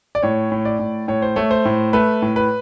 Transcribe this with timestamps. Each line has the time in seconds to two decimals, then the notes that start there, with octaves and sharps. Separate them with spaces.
0.15 D5
0.23 A2 C#5
0.52 A2
0.65 D5
0.79 A2
1.08 A2 C#5
1.22 C5
1.36 A3 C#5
1.51 C5
1.65 A2
1.93 A3 B4
2.22 A2
2.36 B4